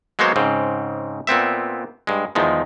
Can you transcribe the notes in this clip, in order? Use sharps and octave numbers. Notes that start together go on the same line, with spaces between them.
F#3 G#3 A#3 B3 C5 C#5
G#2 C#3 C4
A#2 B3 C4 E5
G2 G#3
E2 D#3 F3 G#3